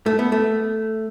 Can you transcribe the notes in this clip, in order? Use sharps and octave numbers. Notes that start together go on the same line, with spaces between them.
A3
B3
A3